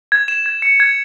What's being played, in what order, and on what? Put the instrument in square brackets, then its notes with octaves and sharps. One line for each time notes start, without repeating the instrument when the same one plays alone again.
[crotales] G#6
E7
G#6
C#7
G#6